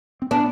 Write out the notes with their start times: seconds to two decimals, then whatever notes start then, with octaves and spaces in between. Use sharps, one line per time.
0.22 C4
0.31 B3 D4